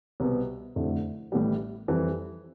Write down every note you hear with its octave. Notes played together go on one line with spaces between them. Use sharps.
C2 B2 B3
F1 F2 D3 A3 E4
A1 A2 E3 G3
F2 E3 G3